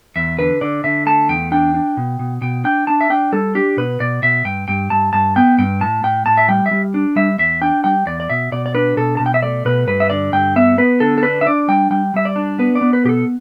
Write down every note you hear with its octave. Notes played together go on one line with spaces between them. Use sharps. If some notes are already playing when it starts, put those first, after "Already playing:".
E2 E5
D3 B4
D3 D5
D3 E5
A3 A5
E2 G5
D4 G5
D4
B2
B2
B2 G5
D4 G5
D4 A5
E5
D4 G5
G3 A4
D4 G4
B2 B4
B2 D5
B2 E5
G2 G5
G2 G5
G2 A5
G2 A5
B3 G5
G2 G5
A2 A5
A2 G5
A2 A5
E5
G3 G5
E5
G3
D4
G3 E5
E2 E5
D4 G5
G3 G5
E2 D5
D5
B2 E5
B2 D5
D5
D4 B4
B2 A4
B2 A5
G5
E5
A3 D5
B2 B4
G2 B4
E5
D3 D5
G2 G5
B3 E5
B3 B4
D3 A4
A4
D4 B4
E5
D4 D5
G3 G5
G3 G5
G3 E5
D5
D4
B3 B4
D5
B3
B4
B2 G4 A4